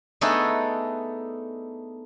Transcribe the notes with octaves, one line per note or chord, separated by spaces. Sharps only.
A3 B3 D4 D#4 G#4 A4